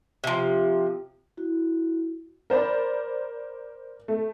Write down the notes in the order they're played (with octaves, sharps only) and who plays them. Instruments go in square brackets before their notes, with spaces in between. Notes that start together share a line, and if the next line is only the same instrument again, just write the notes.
[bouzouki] C3 F3
[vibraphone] E4 F#4
[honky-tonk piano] A#4 C5 D5 B5
A3